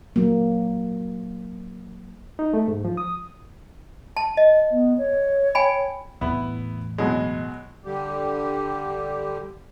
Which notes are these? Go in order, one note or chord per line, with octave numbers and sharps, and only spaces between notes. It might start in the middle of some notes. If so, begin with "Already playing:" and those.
F#3 A#3
D#4
A3
G#2
F3
D#6
A5
D#5
B3
C#5
G5 G#5 B5
E2 A2 B3 E4
B2 F#3 G#3
D3 G3 G4